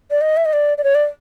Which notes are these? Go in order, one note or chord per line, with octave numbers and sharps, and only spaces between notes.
D5
D#5
E5
D#5
D5
D5
C#5
D5